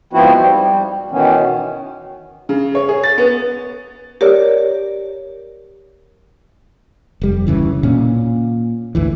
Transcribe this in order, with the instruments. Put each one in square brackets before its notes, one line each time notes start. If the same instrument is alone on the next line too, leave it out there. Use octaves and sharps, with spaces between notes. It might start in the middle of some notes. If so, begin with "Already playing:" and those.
[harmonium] G#2 F3 B3 C4 E4 F#4
G3
B2 D#3 E3 B3 C#4
[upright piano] C#3
C#5
G#4
A6
B3
[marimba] G4 A#4 C#5 D5
[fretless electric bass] F1 G3
D1 B1 C#3 E3
A#2 C#4
G#1 D2 E3